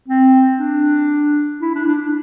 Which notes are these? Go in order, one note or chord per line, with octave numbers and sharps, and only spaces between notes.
C4
D4
E4
D4
D4